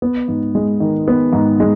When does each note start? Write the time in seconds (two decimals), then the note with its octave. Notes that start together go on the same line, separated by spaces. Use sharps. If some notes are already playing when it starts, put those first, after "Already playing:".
0.02 B3
0.28 G#2
0.55 G#3
0.80 D#3
1.08 B3
1.33 G#2
1.60 G#3